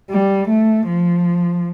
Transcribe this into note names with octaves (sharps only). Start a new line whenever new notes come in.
G3
A3
F3